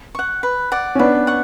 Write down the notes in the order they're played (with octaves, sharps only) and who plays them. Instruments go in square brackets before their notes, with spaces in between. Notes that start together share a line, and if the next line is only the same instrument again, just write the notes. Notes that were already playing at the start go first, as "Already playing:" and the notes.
[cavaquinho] F#5 C#6
B4
D5 F#5
[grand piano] C#4
[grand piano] B3 D4 [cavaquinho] B4
[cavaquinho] F#5 C#6